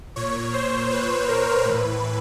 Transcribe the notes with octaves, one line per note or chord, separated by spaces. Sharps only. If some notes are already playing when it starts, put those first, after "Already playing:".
A#2 C#5
C5
B4
A#4
A2 E3 B4